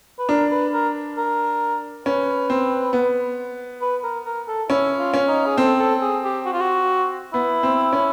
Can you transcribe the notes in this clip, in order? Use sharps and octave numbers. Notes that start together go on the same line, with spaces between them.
B4
D4 A#4
B4
A#4
A#4
C#4 B4
C4
B3
B4
A#4
A#4
A4
C#4 E4
F4
C#4
D#4
G#4
C4 A4
A4
G#4
G4
F#4
F4
F#4
B3 E4
C4
C#4